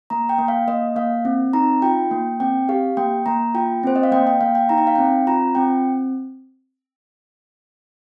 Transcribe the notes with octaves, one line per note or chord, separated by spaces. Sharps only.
A#3 A#5
G5
A#3
F5
A#3 D#5
A#3 F5
C4
D#4 A#5
F4 G5
A#3
C4 G5
G4 F5
A#3 G5
A#3 A#5
F4 G5
C4 C5
D#5
F5
A#3 G5
G5
A#3 F5
G5
D#4 A#5
G5
F5
C4 G5
F4 A#5
C4 G5